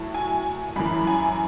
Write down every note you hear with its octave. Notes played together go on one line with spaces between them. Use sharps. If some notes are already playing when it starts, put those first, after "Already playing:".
Already playing: A2 F#3 A5
G#5
F#2 E3 B5
G#5